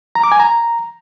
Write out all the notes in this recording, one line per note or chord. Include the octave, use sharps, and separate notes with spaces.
A#5
D6
G#5
A#5